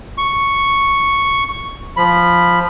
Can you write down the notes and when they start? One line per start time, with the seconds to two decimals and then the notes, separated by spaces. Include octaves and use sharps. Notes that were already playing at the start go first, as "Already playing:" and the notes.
0.18 C#6
1.97 F3 B5